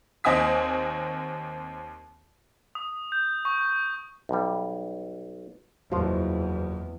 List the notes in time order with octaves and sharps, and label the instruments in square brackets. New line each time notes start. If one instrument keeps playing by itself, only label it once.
[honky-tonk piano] D#2 C4 D#5 G#5 D#6 B6
[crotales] D#6
G6
C#6
[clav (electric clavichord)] B1 G3
[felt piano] F#1 F#3 [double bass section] E2 [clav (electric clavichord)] F3 F4